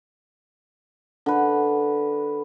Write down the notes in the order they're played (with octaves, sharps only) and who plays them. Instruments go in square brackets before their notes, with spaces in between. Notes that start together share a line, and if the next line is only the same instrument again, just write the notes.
[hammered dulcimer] D3 B4